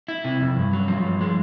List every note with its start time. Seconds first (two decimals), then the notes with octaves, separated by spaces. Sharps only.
0.08 E4
0.25 C3
0.41 F2
0.57 G2
0.73 F#3
0.88 F3
1.05 G2
1.21 G#3